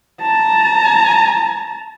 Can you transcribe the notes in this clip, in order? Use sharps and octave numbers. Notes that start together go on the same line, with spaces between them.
A5 A#5